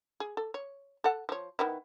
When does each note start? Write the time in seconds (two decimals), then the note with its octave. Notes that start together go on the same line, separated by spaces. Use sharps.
0.20 G#4
0.37 A4
0.54 C#5
1.04 A4 F#5
1.29 F3 C#5
1.59 D#3 B3 E4